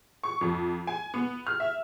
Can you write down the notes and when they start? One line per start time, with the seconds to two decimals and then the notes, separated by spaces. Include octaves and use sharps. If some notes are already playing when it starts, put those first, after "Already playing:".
0.23 C#6
0.41 F2
0.87 G#5
1.14 B3
1.47 F6
1.60 E5